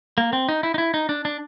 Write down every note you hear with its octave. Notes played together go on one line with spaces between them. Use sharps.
A#3
C4
D#4
E4
D#4
E4
D#4
D4
D4